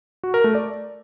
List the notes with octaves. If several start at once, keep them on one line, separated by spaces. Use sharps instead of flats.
F#4
A#4
A3
D5